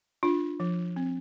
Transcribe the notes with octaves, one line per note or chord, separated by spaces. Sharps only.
D4 F4
F3
C4